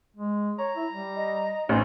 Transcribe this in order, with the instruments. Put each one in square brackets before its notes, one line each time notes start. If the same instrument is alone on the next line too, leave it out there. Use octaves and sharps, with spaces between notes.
[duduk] G#3
[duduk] C#5 [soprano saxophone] A#5
[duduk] E4
G3
[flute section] D#5
[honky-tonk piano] A1 [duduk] D#4 [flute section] B4 C5 G#5